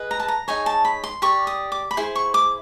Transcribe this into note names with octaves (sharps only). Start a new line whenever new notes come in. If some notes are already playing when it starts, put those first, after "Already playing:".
Already playing: G#4 B4 D#5
A#5
A5
A#5
D#4 G#4 C#5 G#5
A5
B5
C6
G4 A#4 D5 C#6
D#6
D6
B5
E4 G#4 C5 C6
C#6
D6